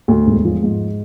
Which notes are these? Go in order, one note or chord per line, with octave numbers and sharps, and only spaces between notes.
D2
E1
F3
G#2